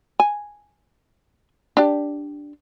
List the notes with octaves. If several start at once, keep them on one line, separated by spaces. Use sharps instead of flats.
G#5
D4 G4